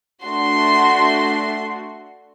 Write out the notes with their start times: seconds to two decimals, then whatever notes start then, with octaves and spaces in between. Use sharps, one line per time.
0.23 A3 D4 F#4 C6